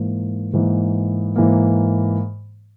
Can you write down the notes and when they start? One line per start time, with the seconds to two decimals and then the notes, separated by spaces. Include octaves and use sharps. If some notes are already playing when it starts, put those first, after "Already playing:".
Already playing: G#2 E3 A#3
0.53 G#2 E3 A#3
1.36 G#2 E3 A#3